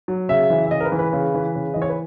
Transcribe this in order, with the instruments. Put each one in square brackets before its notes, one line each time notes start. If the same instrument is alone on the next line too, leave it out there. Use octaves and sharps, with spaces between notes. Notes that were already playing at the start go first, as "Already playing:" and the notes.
[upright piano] F#3
C#3 E5
E3
E5
C#3 D#5
A#4
B4
E3
B4
C#3
E3
C#3
E3 D#5
C#5
B4